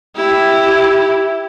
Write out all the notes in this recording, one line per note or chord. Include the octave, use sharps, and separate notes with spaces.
E4 G4